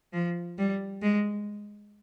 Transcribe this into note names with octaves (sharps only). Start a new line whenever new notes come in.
F3
G3
G#3